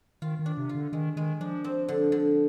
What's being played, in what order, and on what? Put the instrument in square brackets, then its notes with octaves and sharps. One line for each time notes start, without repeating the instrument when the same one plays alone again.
[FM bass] D#3 [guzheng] F4
[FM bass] D#3
[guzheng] D4
[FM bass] C3
[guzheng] F4
[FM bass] D3
[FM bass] D#3 [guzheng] G#3
[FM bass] D#3 [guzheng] G#3
[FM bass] F3 [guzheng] D4
[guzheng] C4
D3
D3